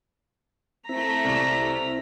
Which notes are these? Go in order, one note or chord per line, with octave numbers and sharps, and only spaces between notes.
A3 C4 E4 A#5 B6
C2 C3